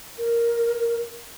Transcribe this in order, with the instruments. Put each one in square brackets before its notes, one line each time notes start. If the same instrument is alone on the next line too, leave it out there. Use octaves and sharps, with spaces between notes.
[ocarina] A#4